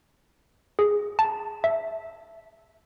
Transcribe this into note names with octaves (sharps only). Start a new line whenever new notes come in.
G#4
A5
E5